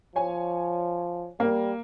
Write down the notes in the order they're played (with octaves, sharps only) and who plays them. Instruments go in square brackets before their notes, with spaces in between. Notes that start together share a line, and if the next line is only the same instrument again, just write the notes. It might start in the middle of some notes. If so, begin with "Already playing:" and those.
[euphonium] F3 [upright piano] C#5 G#5
[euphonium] G3 [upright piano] A#3